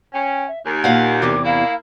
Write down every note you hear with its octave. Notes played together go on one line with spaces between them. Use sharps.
C#4 G5
E5
D#2 G#5
A#2 F5 F#5
E2 C3 E3 D6
A#3 E4 F5